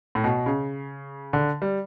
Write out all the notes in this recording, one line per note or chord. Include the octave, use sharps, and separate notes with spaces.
A2
B2
C#3
D3
G3